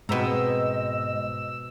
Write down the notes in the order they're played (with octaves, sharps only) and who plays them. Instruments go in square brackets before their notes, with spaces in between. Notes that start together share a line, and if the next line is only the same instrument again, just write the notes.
[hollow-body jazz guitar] G#2 B3 C4 [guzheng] B2 A#5 [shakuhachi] D#5 [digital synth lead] E6